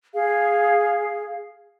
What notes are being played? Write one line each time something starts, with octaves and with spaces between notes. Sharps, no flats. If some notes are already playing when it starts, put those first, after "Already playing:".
G#4 F5